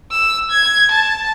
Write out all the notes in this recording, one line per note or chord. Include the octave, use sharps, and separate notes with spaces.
E6
G#6
A5